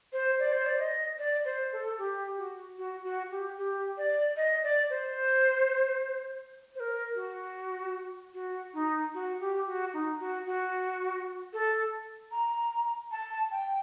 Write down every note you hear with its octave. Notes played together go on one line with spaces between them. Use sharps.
C5
D5
C5
D5
D#5
D5
C5
A4
G4
F#4
F#4
F#4
G4
G4
D5
D#5
D5
C5
C5
A#4
F#4
F#4
D#4
F#4
G4
F#4
D#4
F#4
F#4
A4
A#5
A5
G5